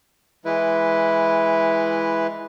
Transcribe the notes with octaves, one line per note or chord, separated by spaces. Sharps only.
E3 G#3 E4 B4